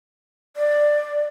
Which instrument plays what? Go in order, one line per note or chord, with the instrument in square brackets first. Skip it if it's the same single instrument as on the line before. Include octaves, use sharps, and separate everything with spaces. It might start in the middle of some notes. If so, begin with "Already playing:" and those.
[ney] D5